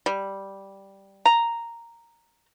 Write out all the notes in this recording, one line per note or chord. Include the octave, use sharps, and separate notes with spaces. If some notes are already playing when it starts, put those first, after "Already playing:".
G3
A#5